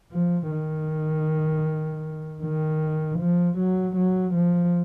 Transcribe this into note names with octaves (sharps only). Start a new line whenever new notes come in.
F3
D#3
D#3
F3
F#3
F#3
F3